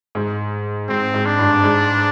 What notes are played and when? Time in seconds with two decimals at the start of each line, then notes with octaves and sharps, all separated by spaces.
0.15 G#2
0.89 G#2 C4
1.14 G#2
1.26 D4
1.39 G2
1.63 G#2